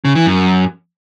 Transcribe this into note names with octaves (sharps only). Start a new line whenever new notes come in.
C#3
E3
F#2